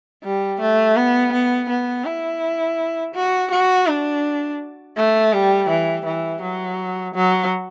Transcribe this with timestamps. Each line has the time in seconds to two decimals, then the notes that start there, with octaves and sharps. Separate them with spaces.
0.23 G3
0.60 A3
0.96 B3
1.32 B3
1.69 B3
2.05 E4
3.14 F#4
3.51 F#4
3.87 D4
4.97 A3
5.33 G3
5.69 E3
6.05 E3
6.42 F#3
7.14 F#3